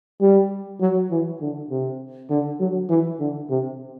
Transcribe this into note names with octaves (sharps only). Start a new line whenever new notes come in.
G3
F#3
E3
D3
C3
D3
F#3
E3
D3
C3